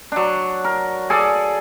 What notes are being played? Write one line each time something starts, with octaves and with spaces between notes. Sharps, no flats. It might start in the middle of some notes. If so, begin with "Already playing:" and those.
F#3 D4
A#4
G#4 A4 D5